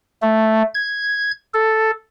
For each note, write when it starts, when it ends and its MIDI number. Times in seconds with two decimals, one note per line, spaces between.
0.22 0.63 57
0.74 1.31 92
1.54 1.91 69